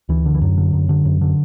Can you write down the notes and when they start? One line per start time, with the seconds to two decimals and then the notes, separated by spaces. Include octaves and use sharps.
0.09 D2 E3
0.26 D3
0.34 E3
0.42 F#2 F#3
0.57 D3
0.73 F#2
0.89 D3
1.05 F#2
1.21 D3